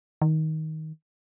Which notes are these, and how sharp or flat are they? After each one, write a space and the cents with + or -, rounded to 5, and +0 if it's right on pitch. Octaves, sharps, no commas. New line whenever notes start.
D#3 +15